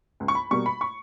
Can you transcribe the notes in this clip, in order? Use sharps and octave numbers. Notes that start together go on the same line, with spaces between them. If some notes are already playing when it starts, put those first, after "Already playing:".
C#2
C#6
B5
B2 G3 A#3 C#6
B5
C#6